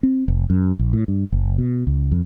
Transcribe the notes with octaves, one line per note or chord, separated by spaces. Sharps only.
C4
F1
F#2
A#1
A2
G2
F#1
B2
C#2
F2